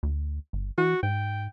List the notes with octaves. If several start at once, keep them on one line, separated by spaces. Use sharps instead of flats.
D2
G1
E3 F#4
G#2 G5